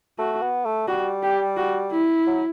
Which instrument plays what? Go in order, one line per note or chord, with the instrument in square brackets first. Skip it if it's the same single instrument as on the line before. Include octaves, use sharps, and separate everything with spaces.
[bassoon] A3 [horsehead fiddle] F#4
[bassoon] B3
A3
[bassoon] G3 [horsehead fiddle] F#4
[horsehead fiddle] G4
F#4
E4
[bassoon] F#3